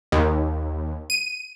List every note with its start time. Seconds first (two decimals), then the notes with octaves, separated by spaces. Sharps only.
0.12 D#2
1.10 D#7